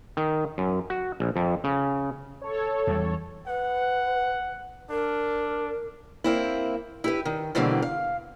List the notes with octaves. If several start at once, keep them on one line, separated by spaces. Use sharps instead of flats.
D#3
F#2
F#4
A#1
F2
C#3
A4 C#5
E2 E3 G3
B4 F#5
D4 A#4
A#3 C4 E4
E4 G4 B4
D#3
B2 D3 E3 G3 A#3 C4
F5